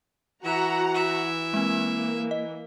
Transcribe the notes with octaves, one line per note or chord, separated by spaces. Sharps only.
E3 F#4 E5 F#5 A#5
E5
G#3 A#3 C4
D#5